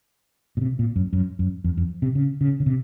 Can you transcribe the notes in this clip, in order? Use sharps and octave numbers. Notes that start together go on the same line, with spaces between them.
A#2
C3
A#2
F#2
F#2
F#2
F2
F2
C3
C#3
C#3
C#3
C3